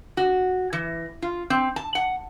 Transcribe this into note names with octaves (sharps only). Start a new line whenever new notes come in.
F#4
E3
F4
C4
A5
F#5